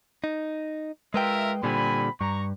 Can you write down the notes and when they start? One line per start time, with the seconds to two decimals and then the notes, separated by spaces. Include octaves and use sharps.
0.24 D#4
1.14 G#3 F4 A#4 B4 E5 G5
1.63 A#2 D3 G3 C4 G#5 B5
2.21 G2 A#5 C#6